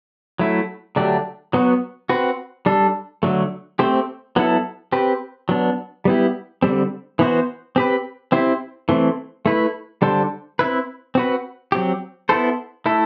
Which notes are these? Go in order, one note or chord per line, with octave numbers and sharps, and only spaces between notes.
F#3 A3 E4
D3 F#3 A3 D4 G4
F#3 B3 F#4
C4 F#4 B4
G3 D4 A4
D3 F#3 A3
A3 C4 G4 C5
F#3 B3 E4 A4
C4 G4 B4
F#3 B3 D4
G3 B3 E4 G4
D3 G3 C4
E3 B3 F#4 C5
C4 G4 B4
C4 E4 G4 C5
E3 A3 C4
A3 E4 B4
D3 G3 D4 A4 C5
C4 E4 B4
C4 F#4 B4
F#3 C4 G4
B3 E4 A4 C5
A3 E4 A4